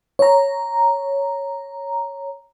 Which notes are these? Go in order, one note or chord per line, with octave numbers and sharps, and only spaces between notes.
C#5 A#5